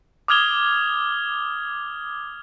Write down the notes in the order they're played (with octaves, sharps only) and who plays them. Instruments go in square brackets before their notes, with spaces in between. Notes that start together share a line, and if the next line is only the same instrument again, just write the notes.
[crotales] D6 D#6 F6 G#6 F7 G7